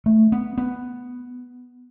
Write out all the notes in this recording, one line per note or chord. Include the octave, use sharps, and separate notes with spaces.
A3
B3
B3